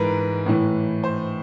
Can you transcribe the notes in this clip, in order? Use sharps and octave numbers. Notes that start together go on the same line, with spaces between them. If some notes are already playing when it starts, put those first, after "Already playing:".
Already playing: G#2 E3 A#4 B4
A2 E3
C5